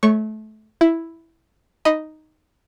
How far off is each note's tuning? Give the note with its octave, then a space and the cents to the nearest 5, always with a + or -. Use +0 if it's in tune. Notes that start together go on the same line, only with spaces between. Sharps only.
A3 -25 C#5 +0 C#6 -10
E4 +0 E5 +5
D#4 +0 D#5 +0 B5 +0